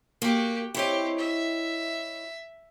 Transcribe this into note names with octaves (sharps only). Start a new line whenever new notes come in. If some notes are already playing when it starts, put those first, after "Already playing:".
A#3 F#4 G4
C4 E4 G4 C#5 D#5
E5